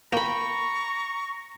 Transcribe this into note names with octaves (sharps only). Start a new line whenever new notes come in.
A#3 G5 A#5 B5 C#6